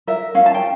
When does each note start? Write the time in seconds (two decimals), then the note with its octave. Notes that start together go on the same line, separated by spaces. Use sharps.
0.07 A#4 E5
0.35 C#4 F5
0.46 A5
0.54 G5